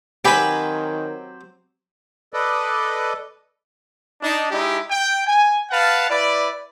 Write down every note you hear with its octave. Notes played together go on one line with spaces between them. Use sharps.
D#3 F#3 C4 G4 B4 G#5 B5
A4 B4 D5 D#5
D4 D#4
G#3 D#4 E4 G4
G5
G#5
B4 F5 F#5 A5
E4 B4 D5